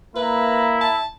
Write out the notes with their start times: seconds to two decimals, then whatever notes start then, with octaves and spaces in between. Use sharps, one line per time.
0.16 A#3 E4 B4 A#5
0.81 A5